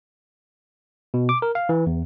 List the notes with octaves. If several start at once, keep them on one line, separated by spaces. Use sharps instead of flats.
B2
D6
A#4
F5
E3
E2